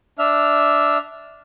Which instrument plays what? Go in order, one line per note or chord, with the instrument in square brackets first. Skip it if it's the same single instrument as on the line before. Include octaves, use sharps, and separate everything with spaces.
[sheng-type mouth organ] D4 E5 F6